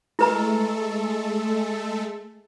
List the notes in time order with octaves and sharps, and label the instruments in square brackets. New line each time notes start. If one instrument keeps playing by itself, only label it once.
[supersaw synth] G#3 A3 A4 [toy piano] E4 B4 A#5